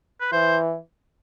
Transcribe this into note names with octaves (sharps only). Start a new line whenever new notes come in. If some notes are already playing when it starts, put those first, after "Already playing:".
B4
E3 C5